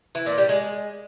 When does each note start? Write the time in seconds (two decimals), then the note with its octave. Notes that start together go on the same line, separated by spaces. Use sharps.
0.15 E3
0.26 A#2
0.38 G3
0.49 G#3